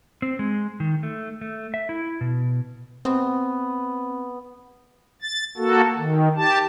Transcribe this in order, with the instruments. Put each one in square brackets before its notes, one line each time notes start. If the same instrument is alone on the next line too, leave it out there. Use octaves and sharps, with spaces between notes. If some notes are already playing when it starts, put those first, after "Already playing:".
[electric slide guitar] C4
G#3
D#3
A3
A3
E5
E4
B2
[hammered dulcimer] B3 [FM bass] C4
[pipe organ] A6
A#3 F#4 A4
D#3
G4 A5